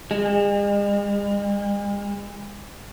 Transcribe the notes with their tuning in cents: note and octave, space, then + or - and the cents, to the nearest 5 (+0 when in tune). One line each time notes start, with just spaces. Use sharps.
G#3 -45